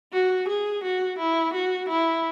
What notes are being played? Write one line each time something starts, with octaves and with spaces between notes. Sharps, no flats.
F#4
G#4
F#4
E4
F#4
E4